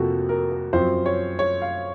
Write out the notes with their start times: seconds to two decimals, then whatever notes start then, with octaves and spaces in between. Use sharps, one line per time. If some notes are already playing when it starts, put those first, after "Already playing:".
Already playing: F2 C3 F3 A#3 F#4 A4
0.29 A#4
0.51 A#4
0.73 F#2 F3 C4 C5
1.06 C#5
1.39 C#5
1.62 F5